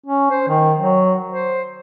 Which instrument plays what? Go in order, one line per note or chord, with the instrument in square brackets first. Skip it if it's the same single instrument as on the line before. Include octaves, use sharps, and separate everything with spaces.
[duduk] C#4
C5
D#3
F#3
C5